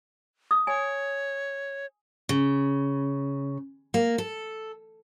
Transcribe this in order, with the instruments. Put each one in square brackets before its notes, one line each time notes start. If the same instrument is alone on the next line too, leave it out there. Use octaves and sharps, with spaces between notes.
[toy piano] D#6
[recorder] C#5 [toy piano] G#5
[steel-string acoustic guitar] C#3
A#3
A4